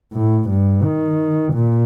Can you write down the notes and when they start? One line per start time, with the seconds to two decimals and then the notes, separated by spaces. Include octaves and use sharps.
0.14 A2
0.49 G2
0.84 D#3
1.53 A#2